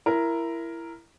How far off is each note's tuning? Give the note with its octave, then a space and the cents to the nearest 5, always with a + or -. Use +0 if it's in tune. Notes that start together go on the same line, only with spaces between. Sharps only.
E4 +20 A#4 +0